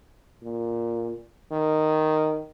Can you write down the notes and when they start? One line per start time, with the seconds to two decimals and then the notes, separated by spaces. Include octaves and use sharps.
0.43 A#2
1.52 D#3